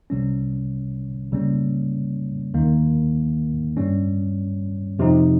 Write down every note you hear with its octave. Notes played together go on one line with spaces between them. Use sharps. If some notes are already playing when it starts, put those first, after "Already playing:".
C2 C3 G3 C#4
C#2 C#3 G3 A#3 C#4
D#2 D#3 A#3
G2 G3 C#4
F2 C3 F3 C4 D#4